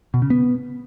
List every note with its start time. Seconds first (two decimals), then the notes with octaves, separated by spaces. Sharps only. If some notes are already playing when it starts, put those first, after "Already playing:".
0.14 B2
0.22 C#3
0.30 B3